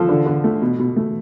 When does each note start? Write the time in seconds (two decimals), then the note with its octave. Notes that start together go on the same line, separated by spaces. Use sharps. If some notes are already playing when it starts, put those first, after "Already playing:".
Already playing: F3 A4 C5
0.09 D3
0.26 D3
0.44 A3
0.62 B2
0.79 B2
0.96 A3